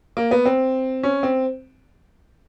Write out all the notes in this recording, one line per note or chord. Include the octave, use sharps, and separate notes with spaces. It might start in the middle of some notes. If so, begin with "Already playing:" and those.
A#3
B3
C4
C#4
C4